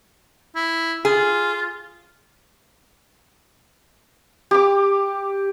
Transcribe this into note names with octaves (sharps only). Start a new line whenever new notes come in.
E4
F4 G#4
G4 D6